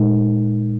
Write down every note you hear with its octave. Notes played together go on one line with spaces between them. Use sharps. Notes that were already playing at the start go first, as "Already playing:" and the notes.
Already playing: A#2 G#3 D#4